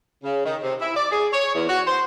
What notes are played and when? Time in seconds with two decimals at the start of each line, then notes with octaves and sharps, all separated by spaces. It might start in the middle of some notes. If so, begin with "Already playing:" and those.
0.24 C#3
0.45 D#3
0.63 C3
0.80 E4
0.95 D5
1.12 G#4
1.33 C#5
1.54 E2
1.69 F#4
1.87 C5